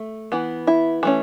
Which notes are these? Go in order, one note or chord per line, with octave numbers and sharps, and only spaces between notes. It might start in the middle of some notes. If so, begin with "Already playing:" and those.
Already playing: A3
E3 B3
E4
E3 A3 C#4